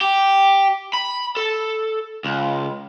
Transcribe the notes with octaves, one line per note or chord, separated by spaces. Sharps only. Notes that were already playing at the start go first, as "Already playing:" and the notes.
G4
B5
A4
C#2